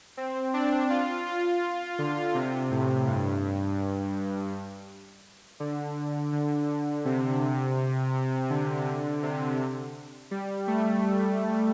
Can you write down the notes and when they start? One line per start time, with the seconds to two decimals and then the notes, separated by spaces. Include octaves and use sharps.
0.17 C4
0.54 D4
0.90 F4
1.26 F4
1.99 D3
2.35 C3
2.71 A2
3.07 G2
3.44 G2
5.60 D3
6.33 D3
7.05 C3
8.14 C3
8.50 D3
9.23 C3
10.31 G3
10.68 A3